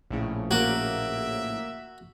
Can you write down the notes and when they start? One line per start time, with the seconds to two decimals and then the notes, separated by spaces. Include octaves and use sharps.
0.10 A#1 A2 C#3
0.51 A#3 F#4 E5